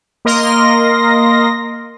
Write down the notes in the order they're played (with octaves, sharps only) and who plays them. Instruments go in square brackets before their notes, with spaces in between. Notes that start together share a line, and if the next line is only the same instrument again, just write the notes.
[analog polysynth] A#3 A#4 D#5 C6 A#6